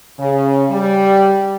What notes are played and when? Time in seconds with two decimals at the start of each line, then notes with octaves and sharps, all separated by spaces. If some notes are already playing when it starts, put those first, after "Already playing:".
0.19 C#3
0.70 G3